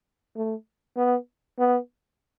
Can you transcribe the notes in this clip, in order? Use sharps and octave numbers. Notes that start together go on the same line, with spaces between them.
A3
B3
B3